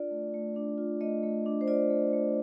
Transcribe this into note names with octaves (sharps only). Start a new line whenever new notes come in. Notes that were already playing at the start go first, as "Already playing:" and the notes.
Already playing: D4 F4 D5
A3
A3
D4
F4
A3 D#5
A3
D4
C5
F4 D5
A3
A3